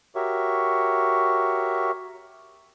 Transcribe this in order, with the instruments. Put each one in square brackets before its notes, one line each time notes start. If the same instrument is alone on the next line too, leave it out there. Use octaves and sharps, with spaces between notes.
[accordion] F#4 G4 A#4 C#5 E5 C#6